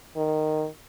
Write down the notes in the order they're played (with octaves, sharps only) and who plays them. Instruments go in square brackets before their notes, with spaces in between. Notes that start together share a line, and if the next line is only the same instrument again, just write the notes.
[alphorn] D#3